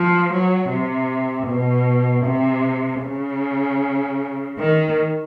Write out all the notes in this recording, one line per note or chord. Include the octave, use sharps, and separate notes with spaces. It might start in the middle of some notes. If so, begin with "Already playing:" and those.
Already playing: F3
F#3
C3
B2
C3
C#3
D#3